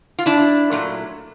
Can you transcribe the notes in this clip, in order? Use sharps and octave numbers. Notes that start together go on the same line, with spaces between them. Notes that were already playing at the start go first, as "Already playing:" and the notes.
F4
D4 E4
A#2 F#3 A3